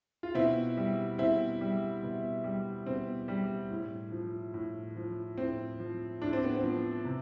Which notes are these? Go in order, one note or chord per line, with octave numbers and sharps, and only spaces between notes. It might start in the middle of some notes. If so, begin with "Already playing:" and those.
F4
B2 C4 E4
G3
B2 C4 E4
G3
B2
G3
B2 C4
G3
A2
F3
A2
F3
A2 C4
F3
A2 D4
C4
B3
C4
F3
C3